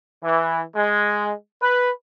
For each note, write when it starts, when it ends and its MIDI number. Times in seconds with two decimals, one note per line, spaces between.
0.23 0.61 52
0.76 1.30 56
1.62 1.89 71